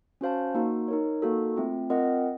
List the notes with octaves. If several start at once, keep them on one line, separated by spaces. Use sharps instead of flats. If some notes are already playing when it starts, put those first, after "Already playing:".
C#4 F#4 C5 F5 A5
A#3 D#4 F#4
D#4 A#4 C#5
A#3 D#4 F#4 A4
A3 C4 F4
C4 F4 A#4 D#5 F#5